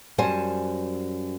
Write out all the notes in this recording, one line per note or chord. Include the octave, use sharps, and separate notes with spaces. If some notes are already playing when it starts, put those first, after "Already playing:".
F#2 G3 C5 G#5 A5